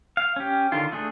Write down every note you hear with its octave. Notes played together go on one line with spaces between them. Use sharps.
F5
C#4 G4
D3 D#3 F4
A3 D4 G#4